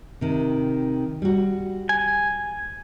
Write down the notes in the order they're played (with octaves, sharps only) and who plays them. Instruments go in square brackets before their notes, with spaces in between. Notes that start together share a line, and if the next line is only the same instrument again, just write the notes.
[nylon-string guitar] C3 D#3
G3 F#4
[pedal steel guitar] G#5